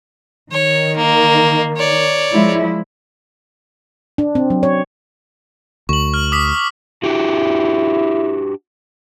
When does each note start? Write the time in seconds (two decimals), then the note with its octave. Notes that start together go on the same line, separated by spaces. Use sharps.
0.51 D#3 C#5
0.97 A#3
1.76 C#5 D5
2.34 F3 G#3 E4
4.18 D4
4.35 C4
4.50 F#3
4.63 C#5
5.89 D2 C#6 F#7
6.14 F6
6.32 D6 D#6 B6
7.03 D4 E4 F#4 G4